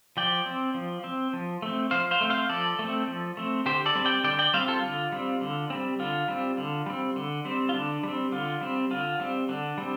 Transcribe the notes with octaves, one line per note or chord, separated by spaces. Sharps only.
F3 D5 G5
C4
F3
C4
F3
A3 C4
F3 C5 F5
C5 F5
A3 C4
C5 F5
F3 A4 D5
A3 C4
F3
A3 C4
D3 G4 C5
A4 D5
G3 C4
D5 G5
D3 D5 G5
D5 G5
G3 C4 C5 F5
F4 A4
D3 F4
G3 C4
D3
G3 C4
D3 F4
G3 C4
D3
G3 C4
D3
G3 C4
F4
D3 D4
G3 C4
D3 F4
G3 C4
D3 F4
G3 C4
D3 D4
G3 C4